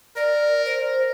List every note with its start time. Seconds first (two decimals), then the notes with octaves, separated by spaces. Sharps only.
0.16 A#4 D5
0.65 C5